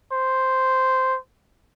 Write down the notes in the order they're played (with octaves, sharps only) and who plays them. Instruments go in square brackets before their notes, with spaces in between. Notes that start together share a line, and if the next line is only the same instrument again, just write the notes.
[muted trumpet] C5